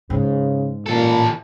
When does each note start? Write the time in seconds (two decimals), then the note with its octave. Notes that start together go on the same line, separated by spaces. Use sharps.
0.10 G#2 C#3
0.86 A#2 E3 A4